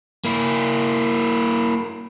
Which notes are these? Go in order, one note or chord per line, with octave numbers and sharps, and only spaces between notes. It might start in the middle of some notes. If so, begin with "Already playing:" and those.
A#3 E4